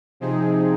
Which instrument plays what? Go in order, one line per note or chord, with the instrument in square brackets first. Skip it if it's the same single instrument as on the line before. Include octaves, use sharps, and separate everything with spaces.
[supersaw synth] C3 F3 C4 D#4 G#4